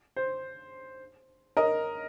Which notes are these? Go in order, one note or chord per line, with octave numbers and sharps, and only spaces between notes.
C5
A#4 D#5